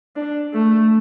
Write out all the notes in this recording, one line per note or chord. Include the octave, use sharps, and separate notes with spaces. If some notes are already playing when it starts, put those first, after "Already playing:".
D4
A3